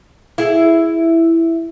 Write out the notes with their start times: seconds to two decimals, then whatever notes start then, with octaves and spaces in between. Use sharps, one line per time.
0.38 E4 G#4